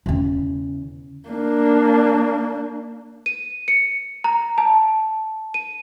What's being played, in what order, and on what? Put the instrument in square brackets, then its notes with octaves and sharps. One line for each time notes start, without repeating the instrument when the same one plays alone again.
[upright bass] E2 C#3
[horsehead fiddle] A#3 D4
[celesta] D#7
C#7
A#5
A5
D#7